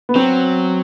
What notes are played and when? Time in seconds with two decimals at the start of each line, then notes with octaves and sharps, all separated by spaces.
0.09 B3
0.15 F#3 C4